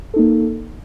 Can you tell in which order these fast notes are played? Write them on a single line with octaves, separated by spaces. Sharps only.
A4 D#4 A#3